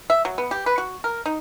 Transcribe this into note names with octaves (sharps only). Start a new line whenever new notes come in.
E5
F#3
B3
G4
B4
F#4
A#4
D#4